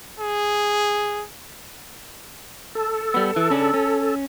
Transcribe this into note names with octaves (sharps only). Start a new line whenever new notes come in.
G#4
A4
G3 B3
E3
C#3 C#4 D4
C#4